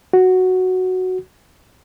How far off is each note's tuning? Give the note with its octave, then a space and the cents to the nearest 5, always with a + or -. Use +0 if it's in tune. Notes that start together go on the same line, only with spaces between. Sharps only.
F#4 +0